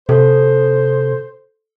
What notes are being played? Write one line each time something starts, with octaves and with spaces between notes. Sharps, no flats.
C3 A4 C5